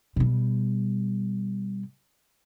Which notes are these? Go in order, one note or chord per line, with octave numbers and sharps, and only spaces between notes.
B2 G3